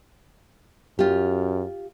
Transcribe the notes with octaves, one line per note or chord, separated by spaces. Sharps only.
F#2 F4 G4